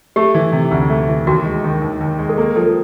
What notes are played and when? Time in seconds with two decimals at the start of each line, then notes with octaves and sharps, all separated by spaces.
0.16 A3 G4
0.34 E3
0.52 C3
0.71 D2
0.90 A3
1.08 E3
1.27 D#2 F#4
1.45 G#3
1.64 D#3
1.82 D#2
2.01 D#2
2.18 G#3
2.29 A4
2.38 A#3 G#4
2.56 F3 A4